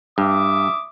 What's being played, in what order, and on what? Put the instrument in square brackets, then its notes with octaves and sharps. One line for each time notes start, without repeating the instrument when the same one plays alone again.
[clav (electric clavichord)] G2 [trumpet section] E5 D6 D#6